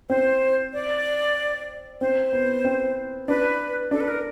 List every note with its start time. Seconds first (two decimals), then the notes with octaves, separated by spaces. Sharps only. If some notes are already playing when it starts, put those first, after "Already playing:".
0.09 C4 C5
0.73 D5
2.01 C4 C5
2.33 B3
2.65 C4
3.28 D4 B4
3.91 D4 A4
4.00 B4
4.08 A#4